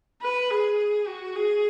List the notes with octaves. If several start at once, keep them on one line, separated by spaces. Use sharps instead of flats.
B4
G#4
F#4
G#4